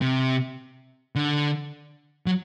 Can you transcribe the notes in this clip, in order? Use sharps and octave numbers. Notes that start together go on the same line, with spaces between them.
C3
D3
F#3